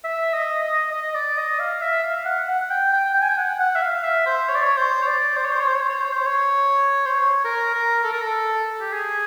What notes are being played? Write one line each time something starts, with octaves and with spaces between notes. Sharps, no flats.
E5
D#5
D#5
D#5
D5
D#5
F5
E5
F5
F#5
F#5
G5
G5
G5
G#5
G5
F#5
F#5
E5
F5
E5
C5
C#5
D5
C#5
C5
C#5
D5
C5
C#5
C5
C#5
C5
C#5
C5
C#5
C5
C#5
C5
C#5
C5
C#5
A#4
A#4
A4
A#4
A4
G4
G#4